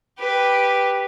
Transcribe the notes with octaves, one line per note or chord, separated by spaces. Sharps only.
G4 B4